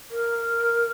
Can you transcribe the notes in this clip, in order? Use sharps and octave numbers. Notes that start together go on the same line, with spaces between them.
A#4